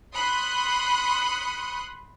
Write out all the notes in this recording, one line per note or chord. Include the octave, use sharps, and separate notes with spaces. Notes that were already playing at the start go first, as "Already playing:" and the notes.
B5 C6 D#6 F#6 C#7